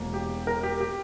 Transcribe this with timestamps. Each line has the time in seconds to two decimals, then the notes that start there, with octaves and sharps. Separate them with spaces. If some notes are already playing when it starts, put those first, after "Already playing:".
Already playing: E1 E2 B2 A#3
0.14 G4
0.47 A#4
0.63 G4
0.81 G4